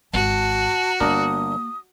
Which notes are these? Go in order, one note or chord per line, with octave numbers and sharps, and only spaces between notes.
G#1 F#4 A5
G1 A#3 D4 A#4 D#6